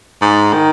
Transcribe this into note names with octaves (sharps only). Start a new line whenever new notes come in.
G#2
D#3